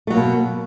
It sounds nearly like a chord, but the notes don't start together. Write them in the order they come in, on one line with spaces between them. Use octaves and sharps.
A3 F#3 A#3 B2